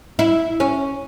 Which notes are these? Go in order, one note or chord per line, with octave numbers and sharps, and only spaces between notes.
E4
C#4